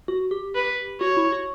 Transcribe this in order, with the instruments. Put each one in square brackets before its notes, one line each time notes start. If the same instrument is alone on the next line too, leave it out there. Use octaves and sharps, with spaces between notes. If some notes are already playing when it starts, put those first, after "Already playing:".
[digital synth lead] F#4
G4
[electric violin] B4
[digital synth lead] F#4 [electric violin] C#5
[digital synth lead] E4
F#4